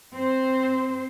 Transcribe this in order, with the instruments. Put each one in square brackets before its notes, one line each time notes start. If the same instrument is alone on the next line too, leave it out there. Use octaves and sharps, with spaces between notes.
[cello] C4 C5